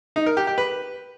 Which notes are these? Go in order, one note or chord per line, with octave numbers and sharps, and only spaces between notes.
D#4
A#4
G4
G4
B4